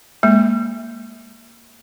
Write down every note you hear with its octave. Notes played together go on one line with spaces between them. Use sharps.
G#3 A#3